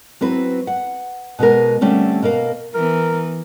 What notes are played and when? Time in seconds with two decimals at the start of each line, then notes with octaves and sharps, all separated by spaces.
0.21 F#3 C4 E4 B4
0.67 F#5
1.39 B2 G#3 B3 A#4
1.81 D3 G3 A3 C4 C#4
2.22 B2 A#3 A#4 F5
2.74 E3 B3 A#4